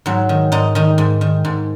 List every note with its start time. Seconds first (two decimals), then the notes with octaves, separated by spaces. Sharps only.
0.06 G#2 F#3
0.29 D#3
0.52 G#2 D#4
0.75 D#3 D#4
0.98 G#2
1.21 D#3
1.45 G#2